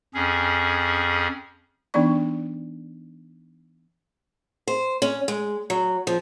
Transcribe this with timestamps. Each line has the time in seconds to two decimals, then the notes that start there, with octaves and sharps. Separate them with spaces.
0.14 F2 C#4 G#4
1.94 E3 B3 D4 D#4 D5 C#6
4.67 C5
5.02 C#4
5.28 G#3
5.70 F#3
6.07 F3